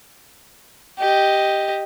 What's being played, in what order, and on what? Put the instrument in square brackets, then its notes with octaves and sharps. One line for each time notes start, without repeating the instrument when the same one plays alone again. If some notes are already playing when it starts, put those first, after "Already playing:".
[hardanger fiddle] G4 D#5